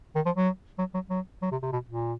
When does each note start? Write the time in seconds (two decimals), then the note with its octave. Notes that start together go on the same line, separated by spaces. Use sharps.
0.15 D#3
0.26 F3
0.36 F#3
0.79 F#3
0.94 F#3
1.10 F#3
1.42 F#3
1.52 C3
1.63 C3
1.73 B2
1.90 A#2